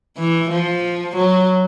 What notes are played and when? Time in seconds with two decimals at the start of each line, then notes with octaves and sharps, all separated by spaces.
0.17 E3
0.51 F3
1.16 F#3